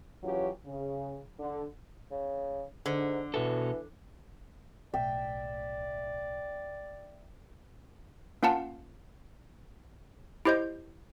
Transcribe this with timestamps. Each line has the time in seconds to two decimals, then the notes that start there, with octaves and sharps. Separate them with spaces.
0.23 E3 F#3 C#4 F4 G4 C#5
0.66 C#3
1.39 D3
2.11 C#3
2.86 G#2 D3
3.34 B2 E3 F#4 A4
4.94 B1 A2 D5 E5 G5
8.43 A#3 C#4 F4 F5 F#5 A5
10.45 E4 G4 C5 D#5 G6